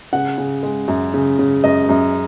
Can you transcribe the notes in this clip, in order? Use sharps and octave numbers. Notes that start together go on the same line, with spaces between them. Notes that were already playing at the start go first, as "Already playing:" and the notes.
C#3 F#5
C#3
G#3
F#2
C#3
C#3
F#2 D#5
F#2